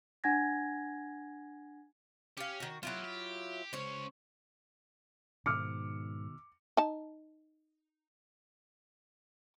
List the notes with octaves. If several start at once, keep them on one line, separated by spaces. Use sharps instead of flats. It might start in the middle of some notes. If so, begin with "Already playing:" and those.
D4 F#5 G#5 G#6 A#6
C#4 G4 F5
D#3 F#4
B1 F#3 E4 F4 G4
G4
C#2 C#4 C5 C#5
G#2 B2 D#3 D6 E6 F6 C#7
D#4 A5